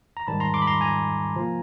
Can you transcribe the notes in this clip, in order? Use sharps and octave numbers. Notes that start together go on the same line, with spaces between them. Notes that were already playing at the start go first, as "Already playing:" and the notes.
A#5
G#2 D#3 G3 A5 B5
A#5 C6
C6 D6
B5
A#5 C6
G#5 A#5
C3 F3 A#3